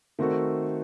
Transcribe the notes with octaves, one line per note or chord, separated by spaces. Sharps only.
D#3 A3 C4 F#4 A4